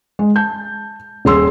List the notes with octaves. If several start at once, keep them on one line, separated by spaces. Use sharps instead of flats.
G#3
A5 G6
D#1 G#4 C6 E6